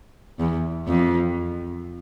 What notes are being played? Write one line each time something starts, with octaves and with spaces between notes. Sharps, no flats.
E2
F2